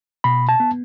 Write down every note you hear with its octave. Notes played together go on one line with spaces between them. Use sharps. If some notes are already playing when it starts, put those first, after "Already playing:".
B2 B5
A5
B3